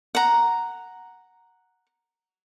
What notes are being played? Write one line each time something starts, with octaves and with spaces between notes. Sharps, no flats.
F#5 A#5